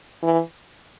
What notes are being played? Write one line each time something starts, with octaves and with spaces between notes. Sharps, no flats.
E3